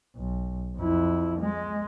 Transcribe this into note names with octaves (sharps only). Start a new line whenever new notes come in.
B1
F2 E4
G#3